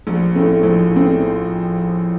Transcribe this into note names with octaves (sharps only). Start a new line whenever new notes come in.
A#1
A2 A3 C4
A#1
A2 A3 C4